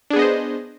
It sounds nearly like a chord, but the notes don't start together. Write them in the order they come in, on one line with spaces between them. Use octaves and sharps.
D4 G#4 B3 D#5 C5